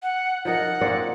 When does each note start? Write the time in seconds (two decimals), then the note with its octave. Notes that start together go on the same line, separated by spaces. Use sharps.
0.03 F#5
0.45 F3 D#4 A#4 F#5
0.81 A#3 C4 D5